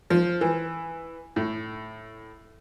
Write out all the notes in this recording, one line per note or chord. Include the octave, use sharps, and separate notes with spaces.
F3
E3
A2